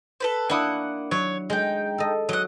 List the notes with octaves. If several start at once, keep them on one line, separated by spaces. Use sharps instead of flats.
A4 B4 C5
A#3 D4 E4 F#5 D#6
F#3 C#5
G#3 D#4 G5
A4 D#5
F#3 D#5 F#5